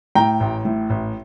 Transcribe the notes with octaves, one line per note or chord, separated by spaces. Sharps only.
A2 G5 A#5
A1
A2
A1